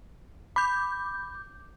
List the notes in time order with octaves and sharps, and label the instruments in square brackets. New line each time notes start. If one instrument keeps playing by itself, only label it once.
[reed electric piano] B5 [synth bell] D6 G6